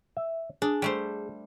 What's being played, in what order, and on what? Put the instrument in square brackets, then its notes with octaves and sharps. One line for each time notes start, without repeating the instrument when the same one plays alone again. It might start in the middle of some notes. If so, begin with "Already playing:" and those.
[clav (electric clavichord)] E5
[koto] D4 [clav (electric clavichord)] G#4
[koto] G3 A3 C5